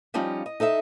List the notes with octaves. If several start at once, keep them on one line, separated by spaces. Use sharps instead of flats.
F3 G3 C#4 D#4 F4
D#5
D#4 A4 D#5 E5